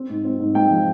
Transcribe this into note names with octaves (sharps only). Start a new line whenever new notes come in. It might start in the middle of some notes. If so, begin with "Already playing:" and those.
Already playing: C4
G#2
C4
G#2
G#2 G5
F3